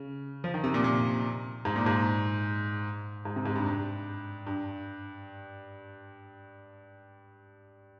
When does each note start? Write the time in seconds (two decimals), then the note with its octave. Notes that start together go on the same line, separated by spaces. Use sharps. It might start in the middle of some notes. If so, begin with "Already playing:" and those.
Already playing: C#3
0.44 F3
0.54 D#3
0.64 C3
0.74 A#2
0.84 A#2
1.65 G#2
1.76 A#2
1.86 G#2
3.25 G#2
3.36 C3
3.46 G#2
3.56 G2
3.66 G2
4.47 G2